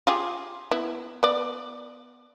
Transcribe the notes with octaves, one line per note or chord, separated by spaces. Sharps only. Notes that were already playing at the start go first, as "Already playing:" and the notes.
F4 G4 G#4
B3 E4
B3 D5